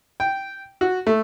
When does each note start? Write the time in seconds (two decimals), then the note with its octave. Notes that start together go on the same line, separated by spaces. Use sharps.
0.20 G5
0.81 F#4
1.07 A3